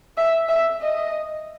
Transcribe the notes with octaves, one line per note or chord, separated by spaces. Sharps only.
E5
E5
D#5